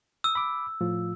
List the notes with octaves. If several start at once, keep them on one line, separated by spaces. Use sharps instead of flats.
D#6 E6
B5 D6
A2 F3 F4